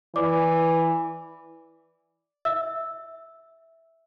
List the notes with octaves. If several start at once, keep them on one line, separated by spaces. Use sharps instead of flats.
E3 D5 D6
E5 E6